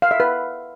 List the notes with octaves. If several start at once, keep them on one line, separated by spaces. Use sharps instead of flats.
F5
E5
B4